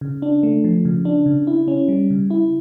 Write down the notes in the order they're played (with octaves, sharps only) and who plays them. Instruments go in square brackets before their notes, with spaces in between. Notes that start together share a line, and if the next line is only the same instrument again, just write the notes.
[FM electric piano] C#3
D4
A3
F3
C#3
D4
C#3
E4
C#4
G3
C#3
E4